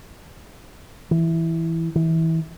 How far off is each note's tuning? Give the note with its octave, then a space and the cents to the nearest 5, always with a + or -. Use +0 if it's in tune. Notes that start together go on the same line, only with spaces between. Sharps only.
E3 -5
E3 -25